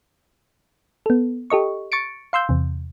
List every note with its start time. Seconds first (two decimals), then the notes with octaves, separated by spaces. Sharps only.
1.06 B3 A4
1.50 G4 A4 D#5 C#6
1.92 C#6 A6 C#7 D7
2.33 F5 C6 E6 G6
2.49 E2 C3